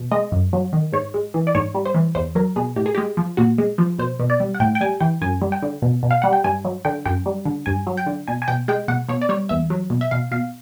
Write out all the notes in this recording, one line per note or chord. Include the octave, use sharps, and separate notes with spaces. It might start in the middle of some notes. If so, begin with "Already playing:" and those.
Already playing: B2
G#3 D#5
F#2
F#3
D#3
G#2 C#5
G#3
E3
D5
G#2 C#5
G3
C5
E3
E2 C5
F#3 A#4
B2 G#4
A2 G4
G#4
G#3 G4
F3
A#2 F#4
G#3
F3
B2 C5
B2
D5
G3
F#5
A2 G5
G5
G3 G#5
E3 G5
F#2 G#5
G3
G5
D3
B2
B2
F5
G3 F#5
G5
G2 G#5
F#3
D3 G5
F#2 G5
G3
D3
G2 G#5
F#3
G5
D3
B2 G#5
G#5
B2 G5
G#3 G5
B2 F#5
B2 C#5
D5
G3 C#5
E2 E5
F#3
B2
E5
B2 F5
B2 F5